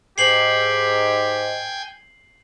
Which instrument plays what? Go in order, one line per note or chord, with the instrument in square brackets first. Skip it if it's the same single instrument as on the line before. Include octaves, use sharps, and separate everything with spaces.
[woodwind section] G#2 [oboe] G4 [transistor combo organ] G5 G#5 [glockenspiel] C7 F#7